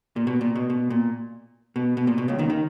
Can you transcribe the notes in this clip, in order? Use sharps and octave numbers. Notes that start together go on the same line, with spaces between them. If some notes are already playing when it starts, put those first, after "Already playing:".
A#2
B2
A#2
B2
B2
A#2
B2
B2
A#2
B2
C#2 C#3
D#2 D#3
D#3